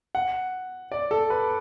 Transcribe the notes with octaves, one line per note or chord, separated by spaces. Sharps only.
F#5
D5
A4
B4